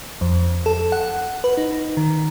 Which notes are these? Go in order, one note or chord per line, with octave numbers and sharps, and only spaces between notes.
F2
A4
F#5
B4
D#4
D#3